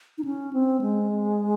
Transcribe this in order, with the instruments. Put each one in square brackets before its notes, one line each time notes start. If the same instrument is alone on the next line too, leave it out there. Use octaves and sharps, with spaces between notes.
[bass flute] D#4
C#4
C4
G#3